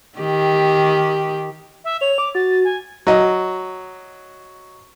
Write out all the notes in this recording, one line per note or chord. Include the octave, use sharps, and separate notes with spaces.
D#3 G4
E5
C#5 F7
D6
F#4 A6
G#5
F#3 D#5